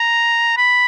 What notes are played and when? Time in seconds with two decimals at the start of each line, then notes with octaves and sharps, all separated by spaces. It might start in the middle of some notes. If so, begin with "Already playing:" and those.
Already playing: A#5
0.57 B5